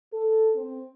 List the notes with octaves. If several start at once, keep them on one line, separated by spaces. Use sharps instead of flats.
A4
C4